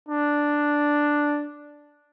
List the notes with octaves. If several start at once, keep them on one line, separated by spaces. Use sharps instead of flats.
D4